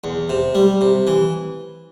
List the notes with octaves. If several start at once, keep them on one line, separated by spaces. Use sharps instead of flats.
E2
C3
G3
C3
E3